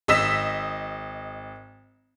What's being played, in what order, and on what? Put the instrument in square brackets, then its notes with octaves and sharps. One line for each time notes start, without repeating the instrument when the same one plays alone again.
[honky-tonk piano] G#1 D#5 E6 B6 E7